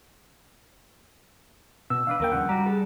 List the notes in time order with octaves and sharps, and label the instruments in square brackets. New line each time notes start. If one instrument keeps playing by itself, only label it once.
[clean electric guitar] B2 [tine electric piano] E6
[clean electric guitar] D#3 D4 B4 [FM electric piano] F5
[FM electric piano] D#2 A#3 G5 [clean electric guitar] A#4 D5
[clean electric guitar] G2 C#3 F3 [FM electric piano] F#5
[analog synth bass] G3 [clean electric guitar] F#4 G4 [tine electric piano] A#5
[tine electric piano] G#4 [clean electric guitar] A4